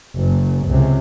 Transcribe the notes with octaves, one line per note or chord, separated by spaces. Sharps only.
F#1
C#2 C3